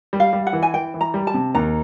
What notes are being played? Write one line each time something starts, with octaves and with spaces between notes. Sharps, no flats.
G3
F5
G3
F#5
E3
G#5
E3 G5
E3
A#5
G3
A5
C3
D#2 A#5